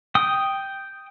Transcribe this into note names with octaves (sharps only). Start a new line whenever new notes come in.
G5 D#6